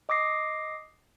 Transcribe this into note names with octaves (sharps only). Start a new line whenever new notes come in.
D#5 D6 D#6 A#6 C7